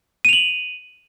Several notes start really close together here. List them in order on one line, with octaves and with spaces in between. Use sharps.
D#7 F7 F#7